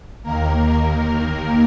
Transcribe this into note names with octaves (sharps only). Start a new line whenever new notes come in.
D#2 D#3 A#3 A#4